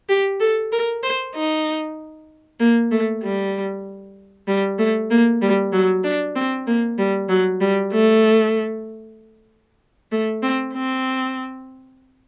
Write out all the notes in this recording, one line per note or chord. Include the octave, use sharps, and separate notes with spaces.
G4
A4
A#4
C5
D#4
A#3
A3
G3
G3
A3
A#3
G3
F#3
D4
C4
A#3
G3
F#3
G3
A3
A3
C4
C4